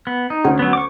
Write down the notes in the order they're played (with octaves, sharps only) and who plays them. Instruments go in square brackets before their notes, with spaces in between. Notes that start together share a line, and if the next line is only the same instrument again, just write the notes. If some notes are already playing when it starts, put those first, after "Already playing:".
[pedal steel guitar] B3
D#4
[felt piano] D2 C#4
[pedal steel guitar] F#3 B3
C#6 D6